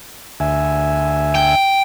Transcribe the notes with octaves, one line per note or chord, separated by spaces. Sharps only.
D2 E5 G#5
G5